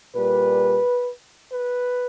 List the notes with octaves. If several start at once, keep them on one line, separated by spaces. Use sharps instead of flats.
A#2 G3 B4
B4